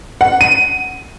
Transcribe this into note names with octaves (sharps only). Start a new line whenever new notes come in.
F#5
D#7